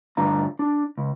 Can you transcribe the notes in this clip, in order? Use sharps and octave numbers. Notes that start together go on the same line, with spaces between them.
D2 G2 D4 F4 A#5
D4
C#2